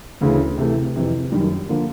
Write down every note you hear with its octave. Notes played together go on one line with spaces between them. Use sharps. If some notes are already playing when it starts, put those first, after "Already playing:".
D2 C#3 E3
C3 E3 A3
F2 C3 E3
F#2 D#3 G3
D3 F3 A#3